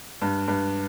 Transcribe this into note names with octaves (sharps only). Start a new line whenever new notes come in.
G2
G2